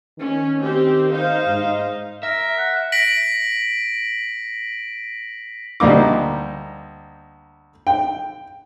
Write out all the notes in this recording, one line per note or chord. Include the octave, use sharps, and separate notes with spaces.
D#3 C#4
C4 G4 C5
D#4 C5 F5
G#2
A#4 E5
F#5
A#6 B6 D7 F#7
D2 G3 A#3 D#4 D6
G5